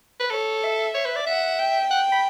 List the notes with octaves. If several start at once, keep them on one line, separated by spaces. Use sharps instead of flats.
B4
A4 C#5
E5
C#5
B4
D5
E5 F#5
G5
F#5
B5